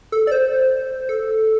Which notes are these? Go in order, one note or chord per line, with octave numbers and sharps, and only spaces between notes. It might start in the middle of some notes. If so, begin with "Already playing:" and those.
A4
D5
C5
A4